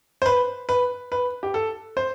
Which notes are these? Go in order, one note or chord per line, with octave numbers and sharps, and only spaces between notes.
C5
B4
B4
B4
G4
A4
C5